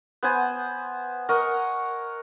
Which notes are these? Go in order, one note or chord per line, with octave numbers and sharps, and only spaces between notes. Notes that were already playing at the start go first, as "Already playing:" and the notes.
B3 C5 G#5
A#4 D#5 F#5 C#6